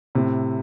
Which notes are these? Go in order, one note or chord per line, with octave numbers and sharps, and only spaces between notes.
A2 C3